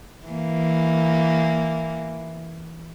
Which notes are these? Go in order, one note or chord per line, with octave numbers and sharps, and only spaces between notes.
E3 A#3